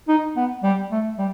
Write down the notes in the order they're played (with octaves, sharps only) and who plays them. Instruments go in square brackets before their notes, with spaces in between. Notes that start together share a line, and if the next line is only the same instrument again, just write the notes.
[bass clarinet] D#4
B3
G3
A3
G3